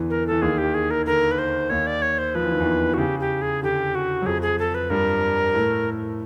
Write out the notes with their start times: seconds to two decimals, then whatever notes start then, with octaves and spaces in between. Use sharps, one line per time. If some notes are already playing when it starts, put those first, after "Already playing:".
Already playing: E2 D3 E3
0.10 A#4
0.27 E3 A4
0.42 D#2 D#3 G#4
0.58 G4
0.74 G#4
0.91 A#4
1.06 D3 A#4
1.31 B4
1.38 C5
1.70 D#2 D#3 C#5
1.87 D5
2.02 C#5
2.18 C5
2.35 F3 B4
2.44 E3
2.51 D#3
2.60 E2 E3
2.94 F#4
2.98 C#3 G4
3.20 G4
3.42 G#4
3.63 D3 G4
3.95 F#4
4.22 F#3
4.26 F2 F3 G#4
4.42 G#4
4.59 A4
4.75 B4
4.90 G2 G3 A#4
5.54 A2 A3